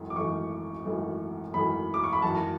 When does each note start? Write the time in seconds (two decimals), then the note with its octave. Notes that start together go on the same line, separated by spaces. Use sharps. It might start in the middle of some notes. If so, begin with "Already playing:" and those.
Already playing: G#1 F#2 E3 A3
0.10 D6
0.16 G#1 F#2 E3 A3 C#6
0.85 G#1 F#2 E3 A3
1.54 G#1 F#2 E3 A3 B5
1.94 D6
2.04 C#6
2.13 B5
2.22 G#1 F#2 E3 A5